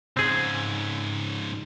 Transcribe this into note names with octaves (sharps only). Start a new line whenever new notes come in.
C#2 G#2 C4 G#4